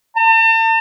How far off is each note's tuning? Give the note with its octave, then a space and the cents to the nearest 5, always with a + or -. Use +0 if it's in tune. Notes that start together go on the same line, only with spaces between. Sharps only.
A5 +40